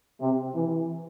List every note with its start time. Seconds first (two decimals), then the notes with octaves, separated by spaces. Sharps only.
0.21 C3
0.55 E3